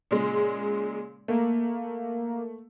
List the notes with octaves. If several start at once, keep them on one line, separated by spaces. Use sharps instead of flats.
A#2 C#3 G#3
A3 A#3